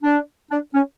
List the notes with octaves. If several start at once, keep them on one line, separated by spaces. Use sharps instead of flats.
D4
D4
C#4